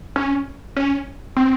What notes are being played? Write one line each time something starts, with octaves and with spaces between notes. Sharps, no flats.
C#4
C#4
C4